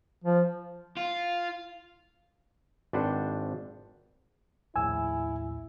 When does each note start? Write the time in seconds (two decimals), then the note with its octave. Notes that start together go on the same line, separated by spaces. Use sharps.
0.24 F3
0.97 F4
2.93 G#1 D4 B4 C5 F#5 G5
4.76 A#1 D#2 A2 E4 G#5 E6